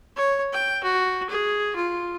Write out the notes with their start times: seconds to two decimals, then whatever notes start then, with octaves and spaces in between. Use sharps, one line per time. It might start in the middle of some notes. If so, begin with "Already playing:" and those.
0.16 C#5
0.53 G5
0.83 F#4
1.30 G#4
1.76 F4